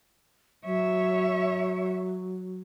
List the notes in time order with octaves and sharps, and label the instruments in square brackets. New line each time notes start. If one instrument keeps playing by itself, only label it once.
[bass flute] F#3 [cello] C#5 E5